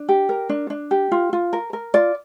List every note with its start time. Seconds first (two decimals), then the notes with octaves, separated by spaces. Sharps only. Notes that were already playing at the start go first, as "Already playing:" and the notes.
Already playing: D4
0.09 G4
0.29 A#4
0.49 D4
0.70 D4
0.91 G4
1.12 F4
1.33 F4
1.53 A#4
1.73 A#4
1.94 F4 D5